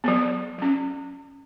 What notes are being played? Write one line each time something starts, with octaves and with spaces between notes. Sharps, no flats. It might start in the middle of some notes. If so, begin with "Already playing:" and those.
F#3 B3
F#3 C#4